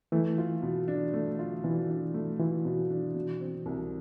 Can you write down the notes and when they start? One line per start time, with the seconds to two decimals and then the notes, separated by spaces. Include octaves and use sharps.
0.12 E3 A3
0.38 F4
0.62 B2
0.88 D4
1.14 A3
1.39 F4
1.63 B2 E3
1.89 D4
2.14 A3
2.39 E3 F4
2.65 B2
2.90 D4
3.15 B2
3.41 C4
3.66 C2